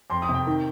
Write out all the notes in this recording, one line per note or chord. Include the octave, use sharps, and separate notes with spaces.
F2 C6
D#6
C3
G5
D#3